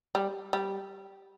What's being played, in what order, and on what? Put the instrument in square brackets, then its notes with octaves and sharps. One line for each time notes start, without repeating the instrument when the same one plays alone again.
[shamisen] G3
G3